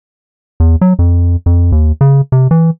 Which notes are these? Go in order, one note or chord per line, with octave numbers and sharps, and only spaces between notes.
E2
F#3
F2
F2
D#2
C#3
C3
E3